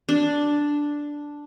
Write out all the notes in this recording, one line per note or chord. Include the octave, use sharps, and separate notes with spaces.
D4